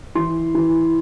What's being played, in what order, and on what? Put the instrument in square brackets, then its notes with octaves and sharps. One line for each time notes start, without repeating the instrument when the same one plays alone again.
[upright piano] E3 C6
E3